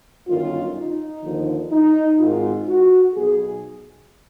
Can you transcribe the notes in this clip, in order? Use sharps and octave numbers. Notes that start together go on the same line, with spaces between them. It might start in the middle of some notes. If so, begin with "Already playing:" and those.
G1 F#2 D#3 F4
D#4
D#2 D3 F3
D#4
G#1 G#2 D#3 F4
F#4
B1 B2 G#4